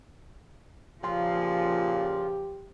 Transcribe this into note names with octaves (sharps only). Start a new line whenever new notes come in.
A#2 C#3 F3 F4 G4